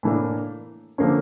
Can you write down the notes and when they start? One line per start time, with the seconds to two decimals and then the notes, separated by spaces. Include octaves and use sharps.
0.03 A2 E3 A#3 D4
0.98 D3 F3 A#3 C#4